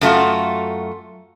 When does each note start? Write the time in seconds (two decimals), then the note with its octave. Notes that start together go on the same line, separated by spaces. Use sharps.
0.01 F#2 A3 F4 F#4